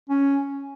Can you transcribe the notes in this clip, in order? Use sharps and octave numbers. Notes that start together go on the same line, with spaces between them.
C#4